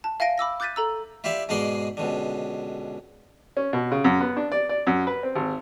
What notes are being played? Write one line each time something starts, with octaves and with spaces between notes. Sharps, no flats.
A5
E5 F5 G#5 A#6 D7
B5 D6 E6 A#6
D6 F#6 G6 A6 B6 D#7
A4 A#5 E6
E4 F4 G4 D5 E5 F5
G#2 B2 G#3 G#4 D5 C6
C#2 B2 D3
C#4
B2
C#3
F#2
B3
D4
D5
D5
F#2
B4
C4
G#1